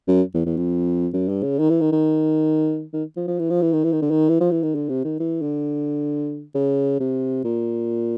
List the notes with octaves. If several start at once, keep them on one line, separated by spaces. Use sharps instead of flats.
F#2
E2
E2
F2
F#2
G2
C#3
D#3
E3
D#3
D#3
D#3
F3
F3
E3
F3
E3
D#3
E3
D#3
D3
D#3
E3
F3
E3
D#3
D3
C3
D#3
E3
D3
C#3
C3
A#2